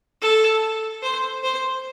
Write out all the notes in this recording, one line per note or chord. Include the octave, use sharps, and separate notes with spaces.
A4
C5
C5